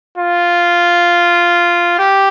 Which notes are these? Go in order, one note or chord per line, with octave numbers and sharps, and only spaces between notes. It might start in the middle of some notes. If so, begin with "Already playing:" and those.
F4
G4